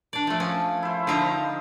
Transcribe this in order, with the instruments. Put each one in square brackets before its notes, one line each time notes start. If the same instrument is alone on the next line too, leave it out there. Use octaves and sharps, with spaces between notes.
[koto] D4 D5
F3 A3
[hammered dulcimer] F3 [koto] C#4
[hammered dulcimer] E4 C5
[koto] D3 F4 A#5 [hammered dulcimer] F3 D#4 C5